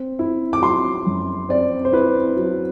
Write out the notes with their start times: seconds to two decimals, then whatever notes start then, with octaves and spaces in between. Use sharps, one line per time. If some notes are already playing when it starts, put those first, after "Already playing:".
Already playing: C4
0.19 E4
0.53 D6
0.62 F#3 C6
1.06 F#2
1.49 C4 D5
1.85 C5
1.93 E4 B4
2.37 F#3